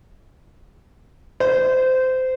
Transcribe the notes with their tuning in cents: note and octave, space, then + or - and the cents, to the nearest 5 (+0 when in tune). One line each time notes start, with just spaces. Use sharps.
C5 -20